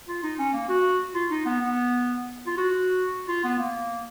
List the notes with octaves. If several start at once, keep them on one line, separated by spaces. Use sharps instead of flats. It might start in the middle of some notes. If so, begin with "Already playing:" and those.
F4
D#4
C#4
A#3
F#4
F4
D#4
B3
B3
F4
F#4
F4
B3
A#3